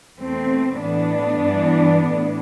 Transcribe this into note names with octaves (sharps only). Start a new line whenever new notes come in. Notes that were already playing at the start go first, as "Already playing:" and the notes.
E2 B2 A3 C4
A2 E3 B3 D4
G2 E3
A2 E3